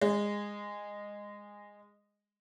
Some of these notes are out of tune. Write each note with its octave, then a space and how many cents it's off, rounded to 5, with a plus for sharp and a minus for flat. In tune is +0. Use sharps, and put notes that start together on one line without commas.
G#3 -15